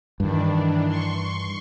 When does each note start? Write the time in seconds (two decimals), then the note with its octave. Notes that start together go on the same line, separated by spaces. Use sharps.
0.20 G2 D#3 E3 D4
0.86 C6 C#6